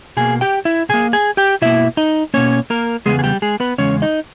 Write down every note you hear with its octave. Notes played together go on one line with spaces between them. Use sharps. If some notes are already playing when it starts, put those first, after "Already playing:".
B2 A#3 G#4 G#5
G4 G5
E4 E5
B2 A#3 G#4 G#5
G#4 G#5
G4 G5
B2 A#3 E4 E5
D#4 D#5
B2 A#3 C#4 C#5
A#3 A#4
E2 C#3 G#3 B3 G#4
G#4
G3 G4
G#3 G#4
B3 B4
E2 C#3 G#3 C#4 C#5
D#4 D#5